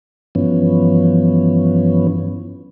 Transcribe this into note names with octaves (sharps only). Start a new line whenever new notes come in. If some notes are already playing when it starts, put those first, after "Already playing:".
G2 E3 F3 B3 C#4